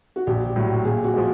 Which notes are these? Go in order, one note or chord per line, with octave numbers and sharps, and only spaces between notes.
F#4
A#1 G4
A2 F#3
A#2 G#4
F#4
F3 G#3